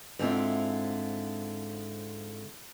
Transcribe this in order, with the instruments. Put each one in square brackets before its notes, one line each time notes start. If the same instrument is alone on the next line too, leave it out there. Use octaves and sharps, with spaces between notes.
[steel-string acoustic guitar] G#2 D3 C4 E4 F4